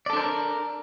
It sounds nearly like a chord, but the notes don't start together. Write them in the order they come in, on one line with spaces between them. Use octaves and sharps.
D5 A4 D4 C5 A#4